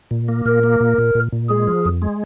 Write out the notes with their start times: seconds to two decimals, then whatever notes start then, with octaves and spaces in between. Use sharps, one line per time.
0.11 A#2
0.28 A#3
0.45 A#2 A#4
0.63 A#3
0.80 A#2
0.98 A#2
1.15 A#2
1.32 A#2
1.50 G#3 G#4
1.67 F3
1.85 F2
2.02 G#3